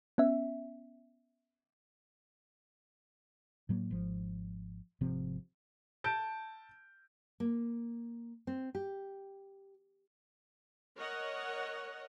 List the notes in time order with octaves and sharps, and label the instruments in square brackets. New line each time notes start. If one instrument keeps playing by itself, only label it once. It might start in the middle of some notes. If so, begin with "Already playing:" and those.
[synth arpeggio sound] B3 C#4 E5
[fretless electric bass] A2 F#3 A#3
G#1 F3
G#1 C3 F3 C4
[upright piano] A5 G6 D7
[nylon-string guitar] A#3
C4
G4
[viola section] A#4 C#5 D#5 F#5